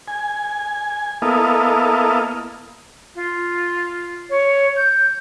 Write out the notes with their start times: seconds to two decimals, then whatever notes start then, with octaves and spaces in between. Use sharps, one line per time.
0.08 G#5
1.22 A#3 B3 E4 A4 D#5 F5
3.15 F4
4.30 C#5
4.76 G6